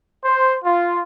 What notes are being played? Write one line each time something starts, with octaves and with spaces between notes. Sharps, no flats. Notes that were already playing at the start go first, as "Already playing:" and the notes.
C5
F4